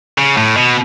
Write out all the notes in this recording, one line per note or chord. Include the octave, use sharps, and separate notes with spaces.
C#3
A2
B2